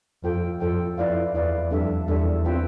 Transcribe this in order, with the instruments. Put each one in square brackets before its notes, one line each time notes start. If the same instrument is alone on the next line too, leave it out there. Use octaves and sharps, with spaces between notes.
[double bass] F2 [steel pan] F4 A4 C5 G5
[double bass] F2 [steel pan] F4 A4 C5 G5
[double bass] F2 [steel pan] E4 B4 D5 F5
[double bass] E2 [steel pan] E4 B4 D5 F5
[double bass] F2 [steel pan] G3 D4 A4 E5
[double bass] E2 [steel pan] G3 D4 A4 E5
[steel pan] C4 F4 B4 E5 G5